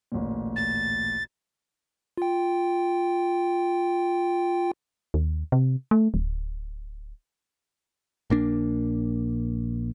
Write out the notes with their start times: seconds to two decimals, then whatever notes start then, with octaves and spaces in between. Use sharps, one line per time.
0.12 A1 D2 A#2
0.56 A6
2.17 F4 G5
5.14 D#2
5.52 C3
5.91 A3
6.14 D1
8.30 A#1 A#3 D4